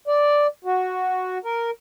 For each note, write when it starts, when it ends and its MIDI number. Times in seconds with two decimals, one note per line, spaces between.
0.08 0.47 74
0.65 1.38 66
1.44 1.71 70